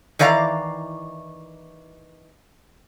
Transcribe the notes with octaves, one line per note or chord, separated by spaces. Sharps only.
D#3 E3 D5 F5 A#5